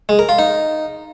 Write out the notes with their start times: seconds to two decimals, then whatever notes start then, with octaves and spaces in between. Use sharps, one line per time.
0.09 G#3
0.19 A#4
0.29 F4
0.39 D#4